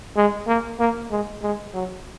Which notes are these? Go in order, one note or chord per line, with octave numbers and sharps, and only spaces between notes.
G#3
A#3
A#3
G#3
G#3
F#3